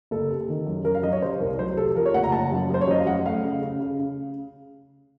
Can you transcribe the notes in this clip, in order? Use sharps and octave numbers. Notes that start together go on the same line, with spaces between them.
F#1 A4
C3
D#3
F#2
F#2 A#4
F5
F#2 D#5
C#5
C3 C5
C2 A#4
F#3 C5
C3 A4
F3 A#4
C#5
F#1 F#5
A#5
F#1 A5
F#2
F#2 C5
C#5
F#2 D#5
F5
F#2 F#5
A3 F5
C#3
C#3
C#3
C#3